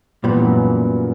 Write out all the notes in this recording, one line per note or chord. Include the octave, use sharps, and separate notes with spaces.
E2 A#2 E3 G3 B3
F#2 F#3